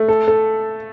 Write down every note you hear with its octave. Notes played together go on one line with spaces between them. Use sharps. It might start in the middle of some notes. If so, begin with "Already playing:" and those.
Already playing: A3
A4
A4